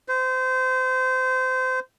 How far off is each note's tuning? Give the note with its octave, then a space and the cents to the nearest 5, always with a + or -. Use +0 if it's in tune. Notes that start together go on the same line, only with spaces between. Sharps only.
C5 -25